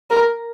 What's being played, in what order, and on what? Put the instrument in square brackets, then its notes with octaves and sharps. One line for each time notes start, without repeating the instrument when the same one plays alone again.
[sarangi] A#4